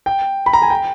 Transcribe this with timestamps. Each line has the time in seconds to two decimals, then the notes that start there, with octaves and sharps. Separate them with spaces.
0.06 G5
0.46 B5
0.53 A#5
0.62 G#5
0.70 G5